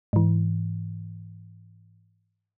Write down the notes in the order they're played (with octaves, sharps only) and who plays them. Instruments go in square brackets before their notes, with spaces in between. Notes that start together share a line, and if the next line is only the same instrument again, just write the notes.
[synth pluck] G#2 E3